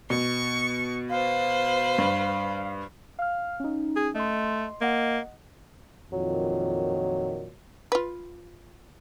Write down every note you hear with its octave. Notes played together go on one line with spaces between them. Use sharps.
B2 C#6
B4 C5 F5
G2
F5 F6
C#4 D#4
G#4
A3 D#5 C6
A#3 D#5 F#5
F2 A#2 D#3 F#3
F4 B4